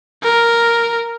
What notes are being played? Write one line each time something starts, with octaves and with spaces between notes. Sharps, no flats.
A#4